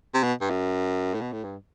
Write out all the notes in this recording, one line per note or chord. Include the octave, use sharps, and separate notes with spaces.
C3
B2
G2
F#2
A2
B2
A2
G2